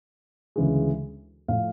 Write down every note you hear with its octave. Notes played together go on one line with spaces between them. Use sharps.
D2 C#3 E3 G#3
A2 F3 A3 F5